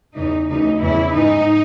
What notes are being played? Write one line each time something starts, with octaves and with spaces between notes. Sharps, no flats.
E2 C#3 E3 D#4
D2 C#3 E3 D#4
E2 C#3 E3 E4
G#2 E3 D#4